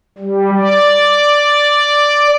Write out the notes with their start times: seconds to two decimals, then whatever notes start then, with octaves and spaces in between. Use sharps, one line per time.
0.19 G3
0.57 D5